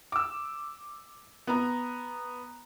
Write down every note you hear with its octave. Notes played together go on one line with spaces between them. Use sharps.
D6 E6
B3 A#5